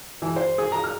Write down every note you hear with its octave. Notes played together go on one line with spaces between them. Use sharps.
E3
C5
G#4
A#5
F6